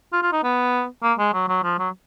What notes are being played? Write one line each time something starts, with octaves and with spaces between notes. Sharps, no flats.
F4
F4
D#4
B3
A#3
G#3
F#3
F#3
F3
F#3